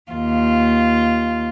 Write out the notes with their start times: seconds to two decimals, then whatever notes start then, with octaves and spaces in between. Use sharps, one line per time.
0.11 D#2 F4